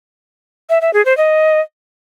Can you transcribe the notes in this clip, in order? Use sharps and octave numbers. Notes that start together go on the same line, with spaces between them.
E5
E5
G#4
C5
D#5